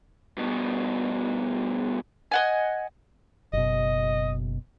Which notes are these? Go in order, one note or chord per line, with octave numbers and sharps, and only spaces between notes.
G2 B2
D#5 F#5 G#5
F#1 B2 D#5